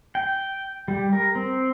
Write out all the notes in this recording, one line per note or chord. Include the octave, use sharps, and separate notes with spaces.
G5
G3
A#4
C4